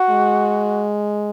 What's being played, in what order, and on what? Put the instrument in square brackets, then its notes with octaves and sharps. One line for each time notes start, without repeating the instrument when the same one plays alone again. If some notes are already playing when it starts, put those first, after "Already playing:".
Already playing: [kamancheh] F#4
[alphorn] G#3